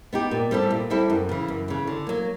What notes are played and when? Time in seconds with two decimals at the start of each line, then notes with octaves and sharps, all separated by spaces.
0.13 B3 D#4 G4
0.31 A#2
0.51 G3 C4 E4 A4
0.71 A#2
0.90 G3 C4 E4 A4
1.10 F#2
1.29 C#3 E3
1.48 F#2
1.68 C#3 E3
1.87 D3
2.07 F#3 A#3